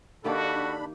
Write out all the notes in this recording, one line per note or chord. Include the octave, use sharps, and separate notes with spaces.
D#3 A#3 D4 F#4 G4 A4 B5